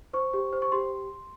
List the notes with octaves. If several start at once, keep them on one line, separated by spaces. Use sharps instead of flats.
C5 C#6
G4
C5
C#6
G4 C6